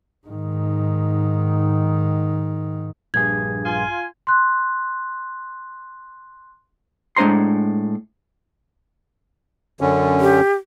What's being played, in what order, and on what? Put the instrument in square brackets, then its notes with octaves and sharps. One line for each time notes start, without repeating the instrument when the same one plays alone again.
[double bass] G#2 D#3
[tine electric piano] A#1 G2 G#4 [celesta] G#6
[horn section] F4 G#5
[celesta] C6 F#6
[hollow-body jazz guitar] A2 G#3 D4 C5 A#5 C6
[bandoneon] F#2 D3 C#4
[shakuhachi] G4